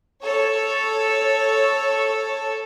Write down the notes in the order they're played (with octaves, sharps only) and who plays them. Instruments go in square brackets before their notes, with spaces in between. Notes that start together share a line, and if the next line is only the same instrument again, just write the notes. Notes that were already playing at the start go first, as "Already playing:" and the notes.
[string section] A4 C#5